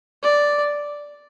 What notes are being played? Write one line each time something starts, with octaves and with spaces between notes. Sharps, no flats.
D5